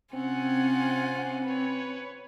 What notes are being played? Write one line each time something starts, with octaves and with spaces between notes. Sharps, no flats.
C3 C4 C#4 F4 F#5 G#5
B4 C#5